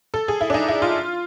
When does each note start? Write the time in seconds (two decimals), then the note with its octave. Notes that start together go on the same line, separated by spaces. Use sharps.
0.14 A4
0.28 G#4
0.41 E4
0.50 D4
0.54 D#4
0.68 E4
0.82 F4